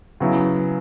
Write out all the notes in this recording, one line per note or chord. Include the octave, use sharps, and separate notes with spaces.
C#3 F#3 B3 E4